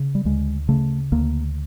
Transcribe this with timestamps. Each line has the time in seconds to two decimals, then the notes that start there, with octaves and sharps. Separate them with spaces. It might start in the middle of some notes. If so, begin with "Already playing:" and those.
Already playing: C#3
0.15 G3
0.25 D2 G#3
0.69 C#3 A3
1.12 D2 A#3